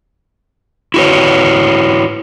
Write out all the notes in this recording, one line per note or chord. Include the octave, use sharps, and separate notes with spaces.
E4 F#4 B4 C#5